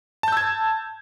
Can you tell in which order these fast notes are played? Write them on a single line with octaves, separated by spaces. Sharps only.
A5 G6 E6 G#6